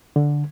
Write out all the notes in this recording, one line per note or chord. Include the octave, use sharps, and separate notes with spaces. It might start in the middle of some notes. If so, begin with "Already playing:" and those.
D3